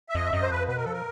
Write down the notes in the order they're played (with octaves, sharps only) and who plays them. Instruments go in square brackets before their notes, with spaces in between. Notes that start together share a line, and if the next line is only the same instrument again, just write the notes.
[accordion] E5
[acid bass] F2 [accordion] D#5
[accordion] E5
[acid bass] F#2 [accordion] D#5
[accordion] C5
[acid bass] F2 [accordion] B4
[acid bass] B2 [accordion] B4
[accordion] A#4
[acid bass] F3 [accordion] A4
[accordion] A#4